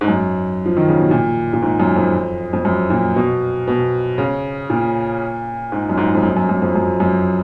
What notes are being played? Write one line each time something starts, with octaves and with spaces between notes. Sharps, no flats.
G#2
F#2
F3
D#3
C#3
B2
A#2
A#2
G#2
F#2
F2
F2
F#2
A#2
B2
B2
C#3
A#2
G#2
F#2
G#2
F2
F#2
F#2
F#2
F2
F#2
F#2